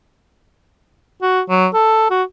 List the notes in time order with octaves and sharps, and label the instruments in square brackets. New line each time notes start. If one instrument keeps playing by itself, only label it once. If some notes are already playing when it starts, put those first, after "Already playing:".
[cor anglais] F#4
F#3
A4
F#4